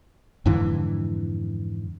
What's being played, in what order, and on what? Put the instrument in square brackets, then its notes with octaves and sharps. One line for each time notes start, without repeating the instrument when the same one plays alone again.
[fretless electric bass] F2 G#2 D3 E3